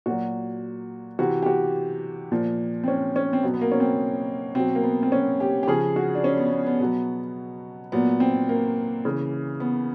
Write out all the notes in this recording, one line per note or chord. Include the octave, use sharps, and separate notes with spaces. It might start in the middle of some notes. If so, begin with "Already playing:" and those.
A#2 F#3 F#4
C3 E3 F#4
G4
F#4
A#2 F3
C4
C#4
C#4
C4
B2 F#3 B3
B3
A#3
C#4
C4
B2 F#3 C4
A#3
B3
C4
C#4
G4
G4
C#3 F3 G#4
F#4
D4
C#4
B3
B3
B3
B2 F#3
A#2 F#3 B3
C4
A#3
C#3 E3
B3